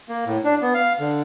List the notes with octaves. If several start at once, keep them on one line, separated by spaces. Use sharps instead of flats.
A#3
A2
D4
B3
F5
D3